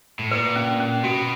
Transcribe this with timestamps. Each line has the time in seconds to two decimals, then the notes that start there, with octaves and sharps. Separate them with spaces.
0.19 A2
0.31 A#2 B4
0.56 C#4
0.80 C#4
1.03 B2 F#4